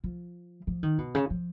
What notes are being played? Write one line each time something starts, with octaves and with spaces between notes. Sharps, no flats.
F3
F3
D#3
B2
C#3
F3